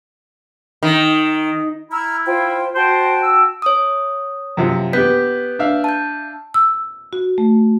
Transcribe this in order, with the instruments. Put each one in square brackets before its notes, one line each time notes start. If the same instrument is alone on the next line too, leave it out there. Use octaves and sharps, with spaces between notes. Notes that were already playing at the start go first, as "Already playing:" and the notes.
[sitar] D#3
[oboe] E4 [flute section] A#5 E6 F6
[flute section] F4 C5 G5
[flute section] F#4 G5 A5 [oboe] C5
[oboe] E6
[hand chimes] C#5 D#6
[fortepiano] F#2 C3 F3
[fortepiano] B3 G4 [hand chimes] B4 G6 B6
[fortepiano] D4 E5 F5
[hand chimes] A5 G6
[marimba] E6
F#4
A3